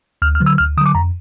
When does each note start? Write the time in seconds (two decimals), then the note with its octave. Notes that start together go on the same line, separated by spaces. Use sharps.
0.22 D2 F6
0.35 F6
0.40 D3 F#3
0.46 E6
0.58 D2 F6
0.77 D3 D#6
0.81 F#3 D6
0.95 F2 A#5